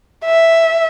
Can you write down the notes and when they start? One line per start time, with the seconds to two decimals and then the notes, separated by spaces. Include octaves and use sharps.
0.25 E5